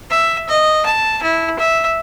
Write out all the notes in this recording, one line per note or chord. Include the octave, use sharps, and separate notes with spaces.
E5
D#5
A5
E4
E5